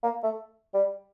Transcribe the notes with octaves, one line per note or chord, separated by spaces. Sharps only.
A#3
A3
G3